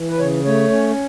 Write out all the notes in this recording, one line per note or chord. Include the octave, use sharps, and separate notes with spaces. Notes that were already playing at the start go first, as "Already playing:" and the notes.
Already playing: E3
B4
C#3 C#5
A3 C#5
C#4